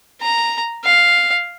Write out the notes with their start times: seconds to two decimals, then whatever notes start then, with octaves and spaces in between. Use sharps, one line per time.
0.22 A#5
0.84 F5